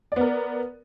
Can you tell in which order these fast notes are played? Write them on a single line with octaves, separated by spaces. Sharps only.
D5 B3 A#4